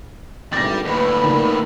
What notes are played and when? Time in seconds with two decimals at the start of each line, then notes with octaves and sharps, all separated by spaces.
0.53 G#1 D2 G3 D5 A6 A#6
0.85 D#2 A2 D3 B4
1.23 D#3